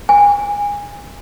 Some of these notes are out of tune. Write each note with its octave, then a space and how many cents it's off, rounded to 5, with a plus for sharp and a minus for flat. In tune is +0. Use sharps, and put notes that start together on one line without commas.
G#5 -25